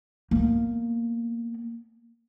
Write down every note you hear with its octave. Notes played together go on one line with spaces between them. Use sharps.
A#3 B3